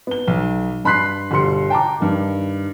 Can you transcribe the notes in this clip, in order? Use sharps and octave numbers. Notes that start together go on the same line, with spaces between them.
B3 G7
B1
G2 B5 C6 F#6 B6 C7
G1 B2 G3 C6 C#7
G5 A5 A#5 D6
G2 D#3